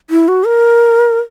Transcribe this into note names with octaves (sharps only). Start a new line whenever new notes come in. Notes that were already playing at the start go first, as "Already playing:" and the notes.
E4
F#4
A#4